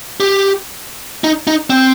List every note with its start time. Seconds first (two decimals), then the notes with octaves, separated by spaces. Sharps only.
0.20 G4
1.24 D#4
1.47 D#4
1.70 C4